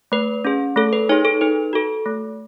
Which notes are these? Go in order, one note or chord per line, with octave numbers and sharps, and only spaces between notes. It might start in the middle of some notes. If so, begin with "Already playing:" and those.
A3 B4
C#4 G#4
A3 A4
B4
D#4 G#4 C#5
A4
D#4 B4
F#4 A4
A3